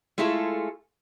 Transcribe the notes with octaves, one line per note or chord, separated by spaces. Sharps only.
G#3 A3 E4 F4 G#4 A4